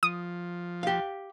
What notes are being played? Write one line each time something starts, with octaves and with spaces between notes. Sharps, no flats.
F3 D#6
G4 F5